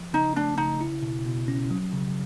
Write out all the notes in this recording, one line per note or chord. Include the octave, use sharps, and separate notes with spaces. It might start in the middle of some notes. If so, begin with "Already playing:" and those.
Already playing: F3
C#3 D#4
A3 D4
C#3 D#4
E4
B2
B2
C#4
F#3
C#3